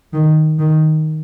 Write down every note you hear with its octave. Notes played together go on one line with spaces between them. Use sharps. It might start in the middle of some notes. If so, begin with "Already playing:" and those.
D#3
D#3